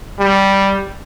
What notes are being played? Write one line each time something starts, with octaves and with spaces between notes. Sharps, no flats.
G3